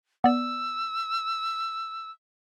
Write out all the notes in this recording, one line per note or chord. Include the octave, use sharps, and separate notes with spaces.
B3 D5 E6